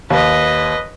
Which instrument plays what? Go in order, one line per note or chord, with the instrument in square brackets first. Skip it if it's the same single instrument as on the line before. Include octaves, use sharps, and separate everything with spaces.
[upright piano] D#2 [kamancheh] B4 D#5